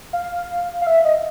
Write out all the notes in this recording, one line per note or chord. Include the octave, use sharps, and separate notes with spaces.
F5
F5
E5
D#5